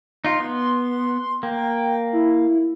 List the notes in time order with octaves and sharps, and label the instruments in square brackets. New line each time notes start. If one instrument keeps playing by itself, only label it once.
[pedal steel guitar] D#4 F4 [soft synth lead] C6
[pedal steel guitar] B3
[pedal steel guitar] A#3 [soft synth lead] G5
[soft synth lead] E4